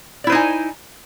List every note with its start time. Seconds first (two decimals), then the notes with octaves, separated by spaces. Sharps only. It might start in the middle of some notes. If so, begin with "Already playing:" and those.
0.24 D5
0.27 E4
0.29 C5
0.32 D#4
0.35 G#5